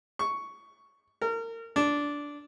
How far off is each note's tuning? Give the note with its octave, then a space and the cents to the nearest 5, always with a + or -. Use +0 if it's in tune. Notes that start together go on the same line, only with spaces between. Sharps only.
C#6 +5
A#4 -30
D4 -10